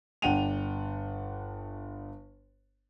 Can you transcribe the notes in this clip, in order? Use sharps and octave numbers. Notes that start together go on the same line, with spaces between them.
G1 D4 F#5 G5 D#7 F7